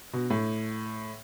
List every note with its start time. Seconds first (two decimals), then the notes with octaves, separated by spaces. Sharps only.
0.13 B2
0.30 A2